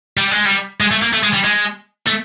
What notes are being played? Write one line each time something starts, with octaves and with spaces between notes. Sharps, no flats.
G3
G#3
G3
G#3
A3
A#3
A3
G#3
G3
G#3
A3